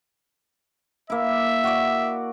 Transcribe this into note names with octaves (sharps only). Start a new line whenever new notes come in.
A#3 E4 E5
F#4 D5